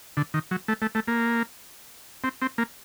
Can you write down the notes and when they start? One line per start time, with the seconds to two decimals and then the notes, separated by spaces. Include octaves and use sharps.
0.17 D3
0.34 D#3
0.51 F#3
0.68 A3
0.82 A3
0.95 A3
1.08 A#3
2.24 C4
2.42 C4
2.58 A#3